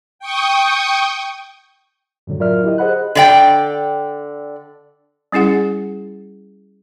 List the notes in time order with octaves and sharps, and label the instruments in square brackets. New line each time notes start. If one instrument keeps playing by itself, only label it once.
[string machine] G5 C#6 D#6
[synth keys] F#2 A2 D3 F#3
F#3 F4 A#4 D5 E5 F6
E4 G4 D#5
G#4 C5 D#5 F#5 B5 F#6
[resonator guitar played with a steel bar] D3 D5 G5
[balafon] G3 C#4 E4 G#4 F#5